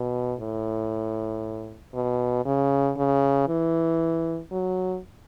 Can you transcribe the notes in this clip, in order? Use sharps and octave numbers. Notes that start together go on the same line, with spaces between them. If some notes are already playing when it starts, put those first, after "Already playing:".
Already playing: B2
A2
B2
C#3
C#3
E3
F#3